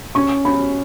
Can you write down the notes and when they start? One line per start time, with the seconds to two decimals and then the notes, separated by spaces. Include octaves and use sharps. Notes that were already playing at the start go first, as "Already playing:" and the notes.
0.15 C#4 C#6
0.45 C#4 B5